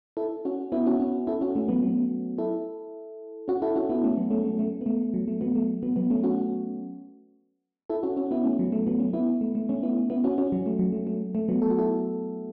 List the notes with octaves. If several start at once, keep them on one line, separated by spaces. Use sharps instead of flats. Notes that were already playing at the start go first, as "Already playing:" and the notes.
E4 A4
C#4 F#4
B3 E4
C#4 F#4
C#4 F#4
E4 A4
C#4 F#4
A3 C#4
F#3 B3
F#3 B3
E4 A4
C#4 F#4
E4 A4
C#4 F#4
B3 E4
A3 C#4
F#3 B3
A3 C#4
A3
A3
B3
A3
F#3
A3
F#3 B3
A3
F#3 B3
F#3 B3
A3 C#4
C#4 F#4
E4 A4
C#4 F#4
C#4 F#4
B3 E4
A3 C#4
F#3
A3
F#3 B3
A3 C#4
B3 E4
A3
A3
A3 C#4
B3 E4
B3 E4
C#4 F#4
C#4 F#4
F#3
A3
F#3
A3
A3
A3
F#3 B3
A4
F#4
E4 A4